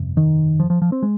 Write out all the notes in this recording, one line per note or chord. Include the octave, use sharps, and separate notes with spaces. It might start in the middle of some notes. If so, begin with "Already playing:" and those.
Already playing: G1 F2 C3
D#3
F3
F3
F3
C4
G#3